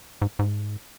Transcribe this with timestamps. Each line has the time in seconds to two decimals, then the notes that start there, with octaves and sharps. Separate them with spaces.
0.22 G#2
0.39 G#2